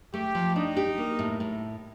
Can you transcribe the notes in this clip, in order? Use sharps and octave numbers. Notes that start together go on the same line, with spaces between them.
A3 G4
F3
D4 D#4
G4
A#3
A2
A2